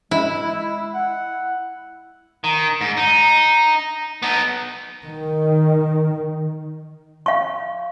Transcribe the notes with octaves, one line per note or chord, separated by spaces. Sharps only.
G#3 E4
F#5
D#3
G#2
D#4
B3 D#4
D#3
F5 C#6